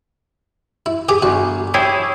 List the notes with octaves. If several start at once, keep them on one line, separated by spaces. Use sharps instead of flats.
E4
G4 G#4 D6
G1 F#4 G#5
E4 G4 G#4 C#5 G5 B5